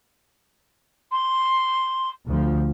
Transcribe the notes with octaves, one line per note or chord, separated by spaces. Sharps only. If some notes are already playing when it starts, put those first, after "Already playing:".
C6
D2 F3